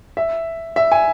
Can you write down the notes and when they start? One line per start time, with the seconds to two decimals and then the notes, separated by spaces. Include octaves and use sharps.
0.17 E5
0.76 E5
0.92 G#5